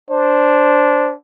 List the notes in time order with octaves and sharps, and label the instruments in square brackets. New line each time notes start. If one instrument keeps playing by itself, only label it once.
[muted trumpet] D4 [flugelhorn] C5